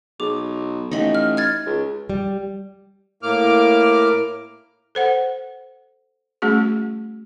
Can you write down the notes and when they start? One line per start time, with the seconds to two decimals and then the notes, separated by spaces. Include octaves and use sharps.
0.20 B1 G#4 D6
0.91 A1 D#4 B5
1.15 F6
1.37 F6 G#6 A6
1.66 C#2
2.10 G3
3.23 A2 A#3 D6 F6
4.95 A4 C5 F#5
6.42 G3 A3 C#4 F#4 G#4